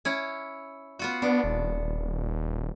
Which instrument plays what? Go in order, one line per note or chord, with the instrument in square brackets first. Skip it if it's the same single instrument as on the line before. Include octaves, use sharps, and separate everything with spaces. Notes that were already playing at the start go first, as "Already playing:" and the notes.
[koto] C#4 E4
B3 F4 F#4
[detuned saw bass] B3 [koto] D4
[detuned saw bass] D#1